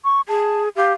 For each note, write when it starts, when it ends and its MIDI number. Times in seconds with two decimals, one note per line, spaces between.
0.05 0.21 85
0.29 0.69 68
0.29 0.63 81
0.76 0.93 67
0.76 0.93 77